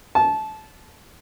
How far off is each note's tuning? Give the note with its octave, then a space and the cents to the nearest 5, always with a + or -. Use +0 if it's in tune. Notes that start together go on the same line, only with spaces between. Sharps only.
A5 -20